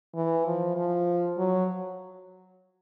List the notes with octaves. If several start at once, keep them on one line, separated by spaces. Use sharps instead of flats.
E3
F3
F3
F#3